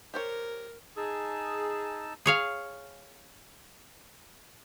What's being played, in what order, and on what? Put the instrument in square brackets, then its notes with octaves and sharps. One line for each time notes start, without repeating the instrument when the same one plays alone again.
[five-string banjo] G4 C5 C#5 [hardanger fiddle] A#4
[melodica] D#4 A5 E6 [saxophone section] G#4
[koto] G#4 C#5 F5